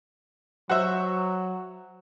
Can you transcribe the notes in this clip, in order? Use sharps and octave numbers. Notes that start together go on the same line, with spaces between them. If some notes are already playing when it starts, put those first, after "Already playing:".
F#3 F#4 C5 E5